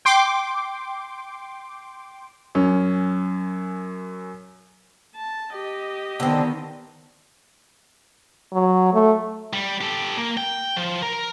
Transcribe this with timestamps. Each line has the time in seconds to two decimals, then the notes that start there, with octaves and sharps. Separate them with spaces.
0.05 G5 C6 D6
2.55 F#2 C#4
5.16 A5
5.51 G4 D#5
6.20 D3 D#3 B3 C4
8.53 F#3
8.94 A3
9.53 G3
9.81 G4 A4
10.17 A#3
10.38 G5
10.77 F3
11.02 A#4